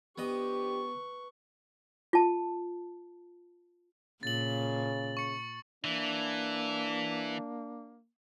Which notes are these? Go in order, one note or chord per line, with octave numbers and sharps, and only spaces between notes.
F3 B3 D4 G4 B4 D#5 C#6
F4 A5
A#2 C#3 A6 F#7
C#6 C#7
E3 A#3 D4